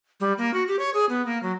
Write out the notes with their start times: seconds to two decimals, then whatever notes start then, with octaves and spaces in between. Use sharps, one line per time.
0.20 G3
0.38 A#3
0.54 F#4
0.68 G4
0.79 C#5
0.94 G#4
1.09 B3
1.26 A#3
1.43 F#3